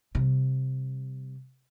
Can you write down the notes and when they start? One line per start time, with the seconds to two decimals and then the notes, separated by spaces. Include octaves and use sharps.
0.15 C3 G3